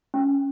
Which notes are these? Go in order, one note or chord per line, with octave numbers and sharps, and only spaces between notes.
C#4